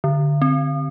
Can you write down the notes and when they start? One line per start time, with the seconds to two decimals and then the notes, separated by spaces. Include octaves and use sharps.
0.04 D3
0.42 C4